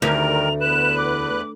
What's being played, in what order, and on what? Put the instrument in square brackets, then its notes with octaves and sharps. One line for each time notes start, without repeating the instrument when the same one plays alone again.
[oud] D2 [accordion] D#3 G3 A#4 [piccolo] F7
[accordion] E2 B4 F#6 [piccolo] E7
[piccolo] D6